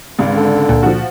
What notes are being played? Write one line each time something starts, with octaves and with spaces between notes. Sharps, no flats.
G#1 C#2
D3
C#2 A#2
F3 F#4